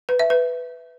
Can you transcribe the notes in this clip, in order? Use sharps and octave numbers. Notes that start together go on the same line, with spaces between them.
B4
E5
B4